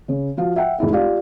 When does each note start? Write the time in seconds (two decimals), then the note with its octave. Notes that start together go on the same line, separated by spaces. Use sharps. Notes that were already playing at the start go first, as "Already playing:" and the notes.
0.08 C#3
0.37 F3 F#4 F5
0.56 E5 F#5 G5
0.79 F1 G#3 E4 E5
0.92 F4 G4 D5 F5